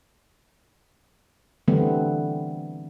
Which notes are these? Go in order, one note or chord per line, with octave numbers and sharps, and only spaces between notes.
D3 E3 G3 A3 B3 C4